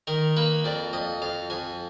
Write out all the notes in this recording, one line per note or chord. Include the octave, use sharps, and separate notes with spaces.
D#3 A#4
A#3 B4
F2 D5
F2 D#5
F2 F5
F2 G#5